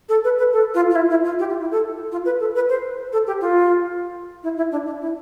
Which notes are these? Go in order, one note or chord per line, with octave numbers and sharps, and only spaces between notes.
A4
B4
B4
A4
F4
F4
E4
E4
F4
G4
F4
E4
A4
F4
B4
A4
B4
C5
A4
G4
F4
E4
E4
D4
D4
E4